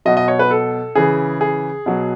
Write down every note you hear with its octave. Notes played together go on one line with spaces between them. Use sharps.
B2 F#3 D#5
D#5
C#5
B4
A4
C#3 E3 G#4
G#4
B2 F#3